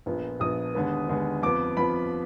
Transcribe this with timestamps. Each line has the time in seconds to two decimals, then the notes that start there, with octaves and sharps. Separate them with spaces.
0.06 A#1 A#2 F3 B3
0.40 A#1 A#2 F3 B3 D#6
0.75 D#2 D3 G#3 B3
1.09 D#2 D3 G#3 B3
1.43 F2 F3 B3 D6
1.77 F2 F3 B3 B5